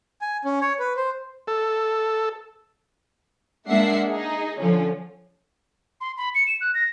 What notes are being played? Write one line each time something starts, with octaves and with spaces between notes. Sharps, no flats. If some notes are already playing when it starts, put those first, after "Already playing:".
G#5
C#4
C#5
B4
C5
A4
G#3 A#3 D4 E5 F#5 C7
D#4 G#4
D3 F3 C#4
C6
B5
C#7
E7
F#6
A#6